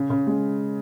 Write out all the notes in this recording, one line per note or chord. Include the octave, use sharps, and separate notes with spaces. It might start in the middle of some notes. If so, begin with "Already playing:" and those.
Already playing: C#3
C#3
G#3